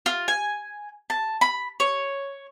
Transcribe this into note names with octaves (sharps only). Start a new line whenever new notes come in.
F4
G#5
A5
B5
C#5